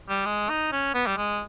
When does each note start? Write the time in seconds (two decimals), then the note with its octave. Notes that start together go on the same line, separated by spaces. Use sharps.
0.09 G3
0.26 G#3
0.49 D#4
0.72 C#4
0.94 B3
1.07 G3
1.17 G#3